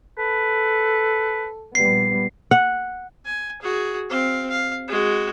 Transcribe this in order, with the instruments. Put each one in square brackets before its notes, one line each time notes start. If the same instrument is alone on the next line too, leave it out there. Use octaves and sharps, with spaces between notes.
[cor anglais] A4 [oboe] B4
[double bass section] A#1 G3 B3 [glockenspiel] C7
[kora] F#5
[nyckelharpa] G#5
F#4 G#4
C4 F5
F5
G#3 F#4